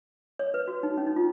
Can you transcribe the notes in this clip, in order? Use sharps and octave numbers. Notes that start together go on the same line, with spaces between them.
C#5
B4
F#4
D#4
C#4
D#4
F4